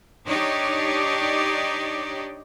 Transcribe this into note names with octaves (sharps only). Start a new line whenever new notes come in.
D4 D#4 G4 C#5 D5